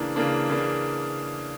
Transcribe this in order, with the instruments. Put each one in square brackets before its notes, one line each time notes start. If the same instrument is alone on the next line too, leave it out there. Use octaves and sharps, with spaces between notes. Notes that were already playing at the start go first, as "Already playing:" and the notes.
Already playing: [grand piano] C#3 E3 A#3 D4
C#3 E3 A#3 D4
C#3 E3 A#3 D4